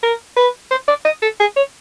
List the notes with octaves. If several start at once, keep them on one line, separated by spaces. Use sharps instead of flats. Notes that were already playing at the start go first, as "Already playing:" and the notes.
A#4
B4
C5
D5
D#5
A4
G#4
C#5